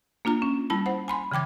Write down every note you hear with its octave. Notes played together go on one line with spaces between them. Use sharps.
A#3 D4 F4 A#5
C#4
G3 E4 A5 B5
C5 F#5
G#5 B5 C6
C#3 E3 G5 D6 G#6